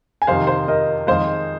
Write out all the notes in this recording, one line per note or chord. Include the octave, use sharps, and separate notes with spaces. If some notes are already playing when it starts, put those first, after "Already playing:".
G#5
F2 C3 D#3 C5 F5
C5 F5
A#4 D#5
F2 D#3 G#3 C5 F5